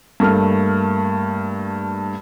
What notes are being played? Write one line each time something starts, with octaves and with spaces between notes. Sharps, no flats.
G2 A3 A#3 F6